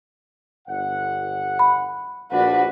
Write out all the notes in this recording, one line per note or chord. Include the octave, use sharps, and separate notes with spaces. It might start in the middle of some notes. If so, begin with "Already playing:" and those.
G1 F#5
B5
A#1 D4 F#4 B4